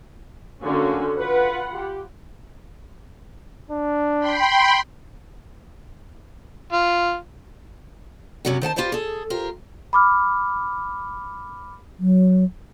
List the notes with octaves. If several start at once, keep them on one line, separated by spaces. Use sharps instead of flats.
D3 F#3 A3 A#3 C#4 F#4
F4 B4 F#5 B5
G4
D4
G5 B5 C6
F4
F#2 C3 F#3 G3 F#4
D#3 C5 F#5 A5
F4 G4 B4 C5 D5
G#4 A4
F4 G4 A#4 C5
B5 D6 F6
F#3